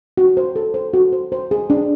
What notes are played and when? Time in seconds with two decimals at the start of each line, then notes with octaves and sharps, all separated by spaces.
0.17 F#4
0.37 C5
0.56 A4
0.74 C5
0.94 F#4
1.13 C5
1.32 C5
1.51 G#4
1.70 D4